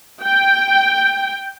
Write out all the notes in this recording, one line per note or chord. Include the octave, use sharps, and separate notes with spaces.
G5